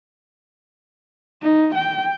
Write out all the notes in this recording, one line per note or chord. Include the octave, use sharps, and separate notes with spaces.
D#4
G5